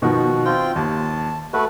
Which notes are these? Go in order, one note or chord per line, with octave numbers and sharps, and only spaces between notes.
B2 D#3 F3 F#4
C4 F4 G5
D#2 A5
A3 F#4 A4 B4